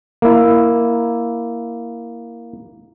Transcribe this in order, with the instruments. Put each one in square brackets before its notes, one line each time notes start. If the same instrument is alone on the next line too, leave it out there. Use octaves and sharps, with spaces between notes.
[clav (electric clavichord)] A#3 E4